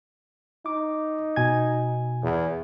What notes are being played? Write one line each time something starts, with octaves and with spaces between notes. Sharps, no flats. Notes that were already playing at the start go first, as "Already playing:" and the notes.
D#4 D6
B2 G#5 G#6
E2